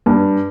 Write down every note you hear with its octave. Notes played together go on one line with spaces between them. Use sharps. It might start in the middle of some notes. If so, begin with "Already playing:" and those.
G2